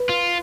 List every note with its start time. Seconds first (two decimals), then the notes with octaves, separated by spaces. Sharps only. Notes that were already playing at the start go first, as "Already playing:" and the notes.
Already playing: B4
0.09 F4